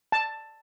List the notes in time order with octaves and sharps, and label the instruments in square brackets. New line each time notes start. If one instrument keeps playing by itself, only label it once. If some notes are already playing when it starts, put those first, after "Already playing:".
[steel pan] A5